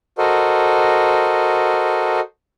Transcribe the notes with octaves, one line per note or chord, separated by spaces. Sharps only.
F#4 A4 A#4 C5 D#5